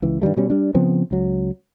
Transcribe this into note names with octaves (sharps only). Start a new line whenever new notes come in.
C#2 E3
G2 D#3 G3 A3
B2 G3 C#4
G3 D4
C#3 F3 B3 C4
C#2 F#3